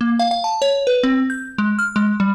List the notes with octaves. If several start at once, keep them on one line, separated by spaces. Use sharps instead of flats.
A#3
F5
F5
A5
C#5
B4
C4
G6
G#3
F6
G#3
G3